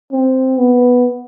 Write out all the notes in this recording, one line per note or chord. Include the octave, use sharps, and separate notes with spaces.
C4
B3